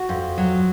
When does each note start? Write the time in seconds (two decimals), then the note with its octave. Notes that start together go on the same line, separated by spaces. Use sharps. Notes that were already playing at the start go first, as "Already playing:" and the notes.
Already playing: F#4
0.09 F2
0.38 F#3